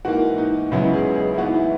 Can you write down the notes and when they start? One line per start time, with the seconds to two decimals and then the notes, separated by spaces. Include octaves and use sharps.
0.05 G#2 E3 A#3 F#4
0.38 D#4
0.71 C#2 C#3 F#3 B3 E4
0.94 G#4
1.16 G#4
1.34 E4
1.38 G#2 E3 B3 F#4
1.54 E4